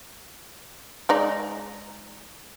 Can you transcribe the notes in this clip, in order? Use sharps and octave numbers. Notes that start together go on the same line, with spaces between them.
G#3 D#4 D5